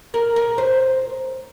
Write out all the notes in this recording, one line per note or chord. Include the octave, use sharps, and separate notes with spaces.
A#4
A#4
C5